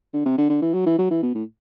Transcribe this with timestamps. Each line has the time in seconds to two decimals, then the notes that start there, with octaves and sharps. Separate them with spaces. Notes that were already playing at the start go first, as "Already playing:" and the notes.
0.13 D3
0.25 C3
0.38 D3
0.49 D3
0.62 E3
0.74 F#3
0.86 E3
0.98 F#3
1.10 E3
1.23 B2
1.35 A2